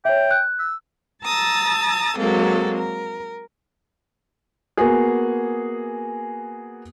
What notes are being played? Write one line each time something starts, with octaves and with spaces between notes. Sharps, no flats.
C#5 E5 G5
F#6
E6
A5 A#5 D#6 E6 A6
F#3 G#3 A#3 C4 A4
A#4
A#3 B3 F#4 G#4